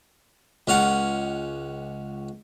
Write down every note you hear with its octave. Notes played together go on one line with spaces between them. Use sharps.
C#2 C#4 F5 F#5